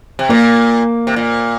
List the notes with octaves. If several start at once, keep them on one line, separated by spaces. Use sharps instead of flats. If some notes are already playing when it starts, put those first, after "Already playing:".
C3
A#2 A#3
C3
A#2